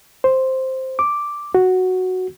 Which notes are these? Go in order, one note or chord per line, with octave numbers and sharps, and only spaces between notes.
C5
D6
F#4